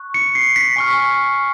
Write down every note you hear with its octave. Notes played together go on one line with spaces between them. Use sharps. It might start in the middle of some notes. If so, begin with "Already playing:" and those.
Already playing: C#6 F#6
C#7
C7
B6
G#5 C#6 F6